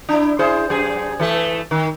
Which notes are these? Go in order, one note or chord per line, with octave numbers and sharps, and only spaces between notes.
D4 E4
E4 G#4 C5
F#2 G#4
E3 A3 A4
D#3